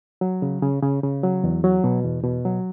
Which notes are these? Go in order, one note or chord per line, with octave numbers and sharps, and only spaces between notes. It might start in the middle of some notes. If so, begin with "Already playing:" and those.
F#3
C#3
C#3
C#3
C#3
F#3
E2
F#3
B2
E2
B2
F#3